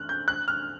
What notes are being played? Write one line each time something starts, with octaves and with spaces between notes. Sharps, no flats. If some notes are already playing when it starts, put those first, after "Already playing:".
Already playing: F6 F#6
G6
F#6
F6